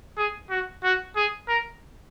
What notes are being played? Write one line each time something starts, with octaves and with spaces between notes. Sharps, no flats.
G#4
F#4
F#4
G#4
A#4